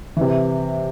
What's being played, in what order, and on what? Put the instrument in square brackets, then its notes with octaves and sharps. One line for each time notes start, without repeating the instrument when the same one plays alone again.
[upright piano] C3 E3